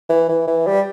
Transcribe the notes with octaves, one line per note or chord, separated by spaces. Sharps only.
E3
E3
E3
G3